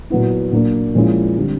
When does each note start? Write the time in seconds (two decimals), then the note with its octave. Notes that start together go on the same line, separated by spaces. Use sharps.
0.10 A#2 F#3 B3 E4
0.52 A#2 F#3 A#3 D4
0.95 A#2 F3 G#3 C#4 E4
1.37 D3 G3 C4